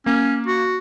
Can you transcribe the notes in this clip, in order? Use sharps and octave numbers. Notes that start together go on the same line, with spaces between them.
A#3 C#4
F#4